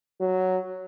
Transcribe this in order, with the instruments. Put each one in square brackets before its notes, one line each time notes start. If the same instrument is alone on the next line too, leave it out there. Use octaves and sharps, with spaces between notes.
[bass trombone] F#3